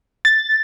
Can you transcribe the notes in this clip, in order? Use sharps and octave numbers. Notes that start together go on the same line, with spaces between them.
A6